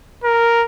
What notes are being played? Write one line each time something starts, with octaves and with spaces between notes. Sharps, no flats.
A#4